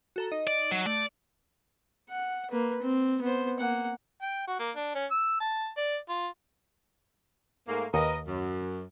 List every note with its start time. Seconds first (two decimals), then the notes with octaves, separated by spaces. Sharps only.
0.16 F#4 A4 A#5
0.31 D#4 D#5
0.47 D5
0.72 F#3
0.86 A3 D5
2.09 F#5
2.51 A#3 B4
2.82 C4
3.22 B3 C5
3.59 A#3 F#5
4.22 G5
4.48 F#4
4.59 A#3
4.76 D4
4.95 C#4
5.11 E6
5.40 A5
5.77 D5
6.09 F4
7.67 G#2 A3 A#3
7.94 D#2 A#4 B4 D#5
8.27 F#2